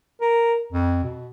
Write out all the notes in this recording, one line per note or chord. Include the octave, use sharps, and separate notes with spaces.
A#4
F2
B2